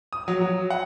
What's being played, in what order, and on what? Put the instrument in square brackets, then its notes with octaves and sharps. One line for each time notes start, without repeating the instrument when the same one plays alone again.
[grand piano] D#6
F#3
F#3
F#5